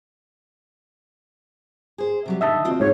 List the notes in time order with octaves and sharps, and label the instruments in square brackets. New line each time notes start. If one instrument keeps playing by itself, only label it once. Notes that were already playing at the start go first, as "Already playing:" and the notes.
[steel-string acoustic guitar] G#4 C5
C3 F#3 G3
[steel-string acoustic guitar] D3 D#3 [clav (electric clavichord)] D#5 E5 A5
[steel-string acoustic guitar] C4 F4 F#4
[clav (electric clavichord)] G#2 [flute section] C#5